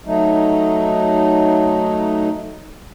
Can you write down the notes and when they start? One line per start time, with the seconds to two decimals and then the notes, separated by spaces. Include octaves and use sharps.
0.06 F#3 A3 D#4